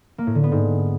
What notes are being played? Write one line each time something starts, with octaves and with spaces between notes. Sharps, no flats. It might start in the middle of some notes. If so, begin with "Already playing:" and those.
A#3
A2
D3
B3
G#2